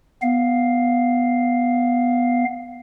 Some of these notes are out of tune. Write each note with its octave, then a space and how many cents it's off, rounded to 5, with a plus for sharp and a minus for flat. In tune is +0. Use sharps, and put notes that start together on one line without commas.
B3 +0 F5 +0